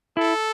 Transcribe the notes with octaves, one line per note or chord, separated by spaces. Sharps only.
E4 A4